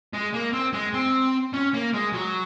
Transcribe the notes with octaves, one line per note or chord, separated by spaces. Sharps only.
G#3
A#3
C4
G#3
C4
C#4
A#3
G#3
F#3